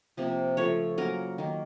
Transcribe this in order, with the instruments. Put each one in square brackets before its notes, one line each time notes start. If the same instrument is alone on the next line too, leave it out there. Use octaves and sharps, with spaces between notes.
[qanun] C3 F3 A#3
C#3 F3 A3 C#5
C#3 F#3 A#3 A#4
D#3 A#3